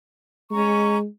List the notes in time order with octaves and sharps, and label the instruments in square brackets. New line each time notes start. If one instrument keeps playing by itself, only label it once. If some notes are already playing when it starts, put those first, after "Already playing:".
[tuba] G#3 [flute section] C#4 A#5 C#6